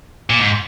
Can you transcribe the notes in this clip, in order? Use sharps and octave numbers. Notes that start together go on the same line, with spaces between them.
A#2
G#2